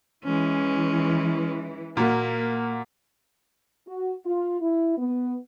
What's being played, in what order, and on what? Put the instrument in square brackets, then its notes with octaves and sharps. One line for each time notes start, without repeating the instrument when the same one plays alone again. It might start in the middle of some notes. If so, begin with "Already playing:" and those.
[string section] E3 [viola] G#3 C#4
[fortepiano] A#2 F#4 [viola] A#3
[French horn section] F#4
F4
E4
B3